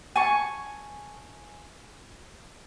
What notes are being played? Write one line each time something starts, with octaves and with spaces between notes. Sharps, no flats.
G#5 A5 C#6